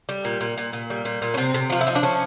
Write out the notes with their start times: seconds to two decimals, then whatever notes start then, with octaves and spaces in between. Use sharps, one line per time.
0.09 G3
0.25 A#2
0.41 A#2
0.58 A#2
0.73 A#2
0.90 G3
1.05 A#2
1.22 A#2
1.34 C#4
1.37 C3 C4
1.54 C3
1.70 F3 F4
1.81 E4
1.87 F3 D#4
1.95 D4
2.03 F3 C#4